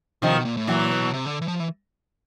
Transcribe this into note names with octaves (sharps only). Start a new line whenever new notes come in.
C3 D#3 F3
B2
A#2
A2
A#2 E3 F#3
B2
C3
D3
E3
F3
E3